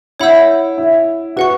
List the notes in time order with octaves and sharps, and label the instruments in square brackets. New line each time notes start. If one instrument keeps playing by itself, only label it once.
[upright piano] E4 [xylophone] C#5 F#5 B5 E6 G6
[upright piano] E4
[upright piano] F#4 [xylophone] B4 F#5 C#6